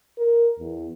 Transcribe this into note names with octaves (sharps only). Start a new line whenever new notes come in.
A#4
E2